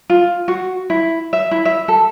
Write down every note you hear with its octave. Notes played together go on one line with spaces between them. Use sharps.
F4
F#4
E4
E5
E4
E5
A4